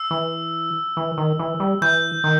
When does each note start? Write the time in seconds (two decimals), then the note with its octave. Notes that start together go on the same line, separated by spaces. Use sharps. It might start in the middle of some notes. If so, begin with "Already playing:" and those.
Already playing: E6
0.11 E3
0.97 E3
1.18 D#3
1.39 E3
1.60 G3
1.82 E3 G6
2.24 D#3